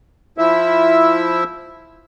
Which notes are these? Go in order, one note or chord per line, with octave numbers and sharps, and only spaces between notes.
F3 E4 E5